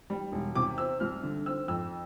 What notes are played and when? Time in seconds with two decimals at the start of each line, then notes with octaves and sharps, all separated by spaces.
0.10 G3
0.32 E1
0.55 C3 D6
0.78 C4 E6
1.00 C2 F6
1.23 D3
1.46 C4 E6
1.68 F2 E6